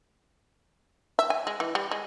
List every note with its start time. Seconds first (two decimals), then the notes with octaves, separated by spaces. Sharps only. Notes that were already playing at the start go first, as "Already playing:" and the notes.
1.19 E5
1.30 G#5
1.47 G#3
1.60 E3
1.75 G3
1.91 G#3